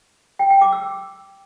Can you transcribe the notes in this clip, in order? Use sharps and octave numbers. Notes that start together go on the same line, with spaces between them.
G5
G5
D6
E6